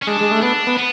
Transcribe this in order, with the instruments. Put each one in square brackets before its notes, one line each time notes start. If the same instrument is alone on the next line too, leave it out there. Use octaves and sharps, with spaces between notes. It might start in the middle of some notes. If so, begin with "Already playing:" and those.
[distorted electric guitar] C#4
[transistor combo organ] G#3 [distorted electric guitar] D4
[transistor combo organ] G#3
A3
[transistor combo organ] B3 [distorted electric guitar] D4
[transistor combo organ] B3
[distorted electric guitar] B3